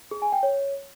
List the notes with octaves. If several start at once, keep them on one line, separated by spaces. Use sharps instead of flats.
G#4
G#5
G5
C#5